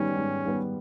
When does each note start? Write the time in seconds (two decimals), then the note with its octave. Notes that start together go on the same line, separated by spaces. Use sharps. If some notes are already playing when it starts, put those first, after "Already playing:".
Already playing: G#2 D#3 G3 B3 C#4
0.16 G#2
0.44 D#3 G3 B3